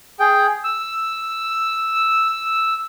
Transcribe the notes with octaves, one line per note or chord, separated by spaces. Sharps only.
G#4 G5
E6